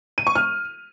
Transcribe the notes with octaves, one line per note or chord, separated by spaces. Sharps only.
D#7
C#6
F6